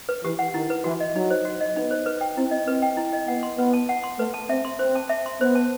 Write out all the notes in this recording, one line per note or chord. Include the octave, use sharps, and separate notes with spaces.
B4
E3 G4
F#5
D#3 E4
B4
E3 F#4
D#5
F#3 D#4
C5
F#4
D#5
B3 D#4
C5
B4
G5
C4 E4
D#5
C4 B4
G5
E4
D#5
B3 F#5
C6
B3 B4
A5
F#5
C6
A3 B4
A5
C4 E5
C6
C4 C5
A5
E5
C6
B3 C5
A5